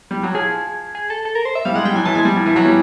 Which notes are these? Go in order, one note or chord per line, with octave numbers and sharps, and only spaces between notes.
G3
F#3
F3 G#4
G#4
A4
A4
A#4
C5
E5
G3 F5
G#3 F#5
G3 G5
F#3 G#5
E3 A5
G#3 G#5
G3
F3
E3
F#3
G3